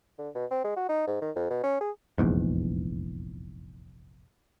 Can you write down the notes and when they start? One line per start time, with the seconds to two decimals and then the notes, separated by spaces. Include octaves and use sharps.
0.19 D3
0.35 B2
0.51 C4
0.64 G#3
0.76 F#4
0.89 D#4
1.07 G#2
1.22 D#3
1.36 F2
1.50 B2
1.63 C#4
1.81 G#4
2.18 F1 A#1 E2 G#2